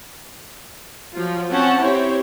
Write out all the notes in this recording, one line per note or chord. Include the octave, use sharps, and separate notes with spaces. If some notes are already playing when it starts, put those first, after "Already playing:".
F3 F#3 F4
C4 C#4 F#5 A5
C4 E4 G4 C5 C#5